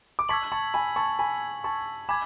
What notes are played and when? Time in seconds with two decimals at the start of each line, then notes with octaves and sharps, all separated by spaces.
0.19 D6
0.29 A5 C#6 E6 G#6 B6 F#7
0.52 A5 C#6
0.74 G#5 B5
0.96 A5 C#6
1.19 G#5 B5
1.64 A5 C#6
2.09 G#5 B5 D6 G#6